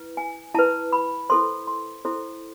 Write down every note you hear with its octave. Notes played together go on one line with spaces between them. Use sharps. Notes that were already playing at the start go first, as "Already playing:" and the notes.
Already playing: E4 B4
G#5
E4 B4 A5
B5
E4 A4 C5 C6
C6
E4 A4 C5 C6